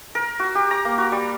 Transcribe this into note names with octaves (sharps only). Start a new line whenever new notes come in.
A#4
F#4
G4
A#5
A#3
F#4
G3